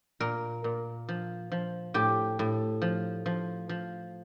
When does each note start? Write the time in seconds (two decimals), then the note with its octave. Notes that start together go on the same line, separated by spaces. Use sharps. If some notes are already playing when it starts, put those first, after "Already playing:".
0.20 A#2 A#4
0.64 A#2
1.09 F3
1.52 F3
1.94 A2 G4
2.39 A2
2.82 F3
3.26 F3
3.69 F3